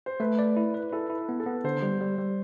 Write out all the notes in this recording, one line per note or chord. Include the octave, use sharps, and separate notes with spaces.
C5
A3 B4
D5
E4
B4
E4 A4
E4
B3
A4
B3
D3 C5
G3
G3
G3